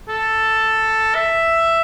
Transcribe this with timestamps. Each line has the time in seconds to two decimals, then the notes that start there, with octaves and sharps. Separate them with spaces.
0.09 A4
1.15 E5